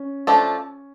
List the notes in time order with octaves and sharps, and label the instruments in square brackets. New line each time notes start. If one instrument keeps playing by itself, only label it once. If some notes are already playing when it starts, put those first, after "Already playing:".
Already playing: [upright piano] C#4
[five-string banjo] F3 A3 D4 A4